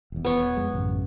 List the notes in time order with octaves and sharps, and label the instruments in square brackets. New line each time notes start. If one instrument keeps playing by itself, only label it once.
[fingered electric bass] D#1 E2
[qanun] B3 C#5
[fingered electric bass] F2 F3 G#3
A1 F#2 C#3